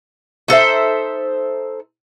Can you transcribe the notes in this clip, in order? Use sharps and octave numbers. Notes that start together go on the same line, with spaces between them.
D#4 A4 C5 E5